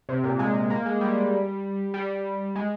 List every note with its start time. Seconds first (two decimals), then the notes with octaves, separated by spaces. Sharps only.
0.09 C3
0.24 A#2
0.39 G#3
0.70 A#3
0.86 G#3
1.01 G3
1.94 G3
2.56 G#3